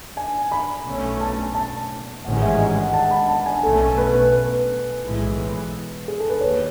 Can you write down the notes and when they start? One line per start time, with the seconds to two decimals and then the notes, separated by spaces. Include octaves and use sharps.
0.17 G#5
0.52 B5
0.85 B1 B2 A3 C#4
1.20 A5
1.55 A5
2.24 A1 G#2 D#3 G#3 C#4 F#5
2.42 E5
2.59 D#5
2.76 F#5
2.94 A5
3.11 B5
3.29 A5
3.46 G#5
3.63 B1 B2 A3 C#4 A4
3.98 B4
4.32 B4
5.02 B1 A2 E3 G#3
6.08 G#4
6.19 A4
6.29 B4
6.40 D#2 D#3 C#5